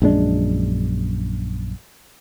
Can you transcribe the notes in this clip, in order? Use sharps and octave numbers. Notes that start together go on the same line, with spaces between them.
A#1 F#2 G#3 D4